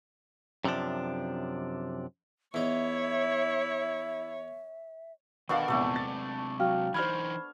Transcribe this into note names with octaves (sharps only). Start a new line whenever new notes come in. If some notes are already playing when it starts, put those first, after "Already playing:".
F#2 C3 E3 F3 D4
E2 D#4 E4 C#5 E5
B2 D#3 D4 A4 A#4 F5 C#6
A#1 E2 C3 G#3 A3 C4 A4
A6
F#3 F5 G5 F6
E3 D#4 C5 B5 F6 G#6